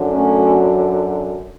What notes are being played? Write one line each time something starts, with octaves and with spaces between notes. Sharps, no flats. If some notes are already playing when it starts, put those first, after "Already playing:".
Already playing: F#2 D3 F#3
A3 C#4